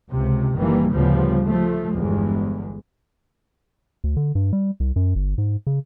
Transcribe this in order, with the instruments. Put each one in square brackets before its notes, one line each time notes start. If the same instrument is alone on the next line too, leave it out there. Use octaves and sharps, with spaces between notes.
[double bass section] C#2 C3
F#1 D#3 E3 G3 A#3
D2 A2 C#3 F3 G3 B3
F3 A3
G1 E2 G#3
[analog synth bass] D2
D3
G2
G3
C2
F#2
G1
G#2
C#3